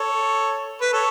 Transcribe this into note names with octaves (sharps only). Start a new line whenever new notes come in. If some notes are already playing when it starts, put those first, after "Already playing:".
Already playing: A4 C#5
B4
A4 C#5